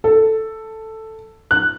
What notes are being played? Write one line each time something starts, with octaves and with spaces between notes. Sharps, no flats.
A4
F#6